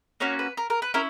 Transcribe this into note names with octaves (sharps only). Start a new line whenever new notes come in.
A#3 C#4 F#4 C#5
B4
A#4
A#4
B4
C#4 E4 A#4